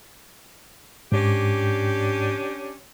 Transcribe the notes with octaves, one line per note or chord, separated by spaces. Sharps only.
G#2 C#4 D4 G4